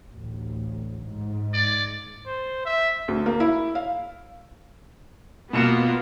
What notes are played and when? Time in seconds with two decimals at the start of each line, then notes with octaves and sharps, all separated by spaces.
0.13 A1 D2
1.03 G#2
1.53 D5
2.27 C5
2.65 E5
3.08 D2
3.26 A#3
3.40 E4
3.75 F5
5.53 B2 A#3 B3 F4 C#7 E7